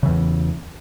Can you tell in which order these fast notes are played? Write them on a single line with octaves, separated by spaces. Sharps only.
C#3 E3 E2